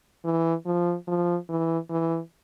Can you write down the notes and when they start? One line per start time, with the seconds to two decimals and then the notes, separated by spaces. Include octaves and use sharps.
0.25 E3
0.66 F3
1.07 F3
1.49 E3
1.90 E3